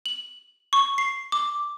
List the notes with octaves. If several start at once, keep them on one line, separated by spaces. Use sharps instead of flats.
F#7
C#6
C7
D6